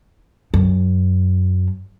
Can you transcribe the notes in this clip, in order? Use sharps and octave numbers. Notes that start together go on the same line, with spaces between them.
F#2